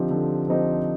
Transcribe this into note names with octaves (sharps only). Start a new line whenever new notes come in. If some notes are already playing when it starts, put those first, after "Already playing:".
Already playing: D3 F3 C4 D#4 G4
D3
F3 C4 D#4 G4